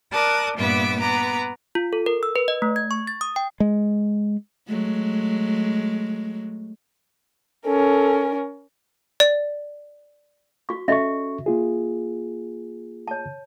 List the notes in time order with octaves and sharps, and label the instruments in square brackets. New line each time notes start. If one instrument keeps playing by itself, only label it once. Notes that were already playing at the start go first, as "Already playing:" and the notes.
[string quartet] A#4 D5 A5 D#6 F#6
G2 A#2 B3 B4 E5 D6
B3 B4 A#5 D6
[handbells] F4
A4
A#4
E6
B4
D#5
A3
G#6
C#6
A6
D#6
G5
[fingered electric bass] G#3
[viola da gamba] F#3 G#3 A3
[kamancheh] C#4 A#4 [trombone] A4
[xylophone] D5
[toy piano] F#4 C#6
[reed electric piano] C#4 A4 C#6 [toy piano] F#4 D#5 E5
[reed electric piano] A#3 F4 G#4
[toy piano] C#5 A5